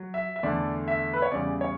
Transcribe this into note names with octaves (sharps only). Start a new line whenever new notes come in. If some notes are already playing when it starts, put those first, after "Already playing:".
Already playing: F#3
E5
E5
E2 D3 A3 D5
E5
B4
C#5
E2 C#3 G3 D5
C#5